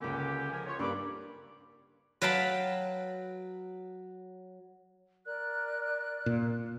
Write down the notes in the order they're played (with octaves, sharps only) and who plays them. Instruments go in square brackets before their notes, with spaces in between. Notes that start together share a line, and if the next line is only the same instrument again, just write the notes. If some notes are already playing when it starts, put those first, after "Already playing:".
[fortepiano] C#2 A#3 [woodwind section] D3 C#4 G4
[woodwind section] F3 A#4 G#5
F4 C#5
[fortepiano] G2 A#3 D4 [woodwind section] A4 B5 D6
[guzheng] F#3 B4 F5 G5 A5 B5
[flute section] A#4 D5 F#6
[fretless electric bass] A#2